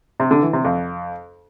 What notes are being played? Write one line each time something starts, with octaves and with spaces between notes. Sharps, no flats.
C3
D3
E3
C3
F2